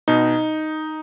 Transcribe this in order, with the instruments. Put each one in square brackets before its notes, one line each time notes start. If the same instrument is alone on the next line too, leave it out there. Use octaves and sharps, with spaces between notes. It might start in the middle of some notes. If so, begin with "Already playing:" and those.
[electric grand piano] B2 B3 D#4